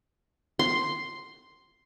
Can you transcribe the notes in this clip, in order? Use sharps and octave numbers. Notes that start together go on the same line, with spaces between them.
C6